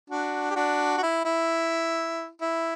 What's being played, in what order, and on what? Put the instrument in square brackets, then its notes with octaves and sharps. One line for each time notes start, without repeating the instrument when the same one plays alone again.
[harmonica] D4 F#4
G4
D4 F#4
F#4
E4
E4
E4